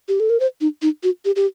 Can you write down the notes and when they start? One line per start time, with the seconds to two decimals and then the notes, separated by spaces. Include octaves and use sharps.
0.08 G4
0.20 A4
0.30 A#4
0.40 C5
0.61 D#4
0.82 D#4
1.03 F#4
1.25 G4
1.36 G4